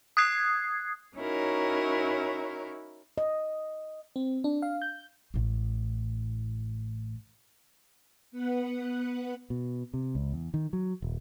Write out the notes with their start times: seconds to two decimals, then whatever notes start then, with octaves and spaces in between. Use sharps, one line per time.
0.17 D#6 F#6 G#6 C7
1.17 C#4 D#4 E4 F#4 A#4 C#5
3.18 D#5
4.16 C4
4.44 D4
4.62 F5
4.82 G6
5.34 A1 A2
8.31 B3 B4 F#5
9.50 B2
9.94 C3
10.15 C#2
10.33 E2
10.54 D#3
10.73 F#3
11.02 D#1